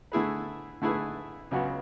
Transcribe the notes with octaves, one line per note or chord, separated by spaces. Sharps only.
D3 A3 E4 G#4 B4
D3 A3 E4 G#4 B4
C#2 C#3 F#3 B3 F#4